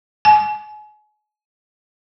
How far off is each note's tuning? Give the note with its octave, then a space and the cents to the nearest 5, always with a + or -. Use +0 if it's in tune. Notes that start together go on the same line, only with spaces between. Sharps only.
G#5 +35